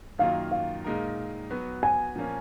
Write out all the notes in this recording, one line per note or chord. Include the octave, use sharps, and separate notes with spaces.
F#2 D#3 F#3 A#3 F4 F5
F5
A#2 G#3 D#4 A#4
F#3 B3 F#4 B4
G#5
A#2 F3 A#3 C#4